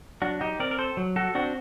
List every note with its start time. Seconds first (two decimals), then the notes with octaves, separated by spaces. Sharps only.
0.22 F#3 D4 F#4
0.41 D#4 G4
0.60 C4 A#4 D5
0.71 A#4
0.79 A4 C5
0.97 F#3
1.16 F#4 A4
1.35 C4 D4 F#4